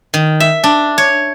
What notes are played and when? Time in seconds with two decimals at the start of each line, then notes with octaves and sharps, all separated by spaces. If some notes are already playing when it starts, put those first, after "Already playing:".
0.14 D#3
0.40 E5
0.64 D4
0.98 C#5